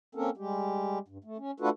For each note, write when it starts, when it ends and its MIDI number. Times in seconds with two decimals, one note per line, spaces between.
0.15 0.30 58
0.15 0.30 60
0.15 0.30 61
0.15 0.30 69
0.15 0.30 70
0.37 0.99 55
0.37 0.99 56
0.37 0.99 67
1.08 1.18 43
1.24 1.37 57
1.37 1.51 61
1.60 1.70 57
1.60 1.70 62
1.60 1.70 65
1.60 1.70 66
1.60 1.70 69
1.60 1.70 71